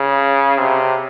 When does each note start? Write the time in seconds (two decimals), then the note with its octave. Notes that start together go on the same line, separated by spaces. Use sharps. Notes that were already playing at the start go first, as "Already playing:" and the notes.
Already playing: C#3
0.58 C3